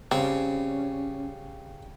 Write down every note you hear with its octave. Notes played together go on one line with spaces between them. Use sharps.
C#3 G3 C4 C#4